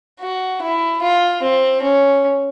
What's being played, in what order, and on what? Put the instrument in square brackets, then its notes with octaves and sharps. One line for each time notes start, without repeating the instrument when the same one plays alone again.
[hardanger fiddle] F#4
E4
F4
C4
C#4